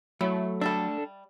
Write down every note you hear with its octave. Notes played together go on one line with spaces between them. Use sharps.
F#3 A3 E4
G3 D4 A4 D5 E5